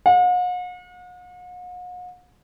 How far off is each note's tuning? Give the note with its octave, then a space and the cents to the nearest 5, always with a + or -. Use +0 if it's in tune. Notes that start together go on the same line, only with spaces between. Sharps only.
F#5 -45